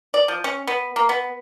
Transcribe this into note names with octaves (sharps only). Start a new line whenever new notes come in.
D5
F3
C#4
B3
A#3
B3